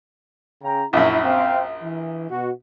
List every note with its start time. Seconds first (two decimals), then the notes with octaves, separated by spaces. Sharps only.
0.63 C#3 G5 A#5
0.93 A#1 F#2 E4
1.23 C4 F5 G5
1.82 E3
2.30 B2 F#4